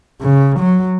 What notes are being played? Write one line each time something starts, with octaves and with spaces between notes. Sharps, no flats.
C#3
F#3